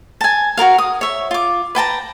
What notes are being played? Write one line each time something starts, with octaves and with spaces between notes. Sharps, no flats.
G#5 A5
F#4 A4 A#4 F5
D#6
C#5 E5
F4 D6
B4 G5 A5 A#5